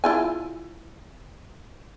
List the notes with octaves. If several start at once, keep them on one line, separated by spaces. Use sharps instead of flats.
E4 F4 G#5